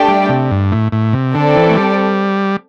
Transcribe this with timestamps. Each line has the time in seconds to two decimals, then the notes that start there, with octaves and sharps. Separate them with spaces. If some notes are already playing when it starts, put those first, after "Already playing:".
Already playing: A3 D4 G4 D5 G5
0.08 G3
0.29 C3
0.51 G2
0.72 A2
0.92 A2
1.13 C3
1.34 D3 C4 A4 D5
1.56 E3
1.69 A3
1.76 G3